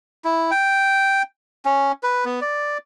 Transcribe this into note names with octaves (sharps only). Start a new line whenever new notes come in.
E4
G5
C#4
B4
B3
D5